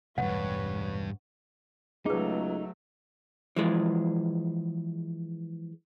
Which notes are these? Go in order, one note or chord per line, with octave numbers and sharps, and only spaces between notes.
E1 A1 D2 G2 B4 C#5 F#5
C#2 F#3 A3 D#4 G#4 B4
E3 F3 G#3